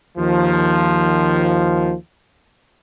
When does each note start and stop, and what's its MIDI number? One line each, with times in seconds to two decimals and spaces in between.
0.18 1.93 39
0.18 1.93 51
0.18 1.93 53